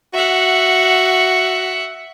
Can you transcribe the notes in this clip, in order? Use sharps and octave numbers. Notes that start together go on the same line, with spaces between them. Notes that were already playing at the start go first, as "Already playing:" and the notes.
F#4 E5 F#5